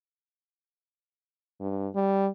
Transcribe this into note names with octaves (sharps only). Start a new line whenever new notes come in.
G2
G3